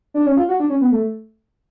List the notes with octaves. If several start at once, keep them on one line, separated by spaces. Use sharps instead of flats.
D4
C#4
F4
F#4
D4
C#4
B3
A3